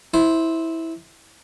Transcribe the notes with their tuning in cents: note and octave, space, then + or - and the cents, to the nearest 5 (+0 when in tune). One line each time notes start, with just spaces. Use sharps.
E4 -15 C5 +0